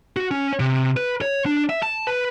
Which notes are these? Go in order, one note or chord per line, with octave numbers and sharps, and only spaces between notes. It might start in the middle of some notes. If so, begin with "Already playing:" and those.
F#4
C#4
C3
B4
C#5
D4
E5
A5
B4